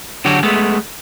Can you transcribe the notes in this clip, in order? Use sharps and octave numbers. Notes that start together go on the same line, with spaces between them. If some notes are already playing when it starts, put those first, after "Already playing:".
D3 F#3 F#4 G4
G#3 A3 B3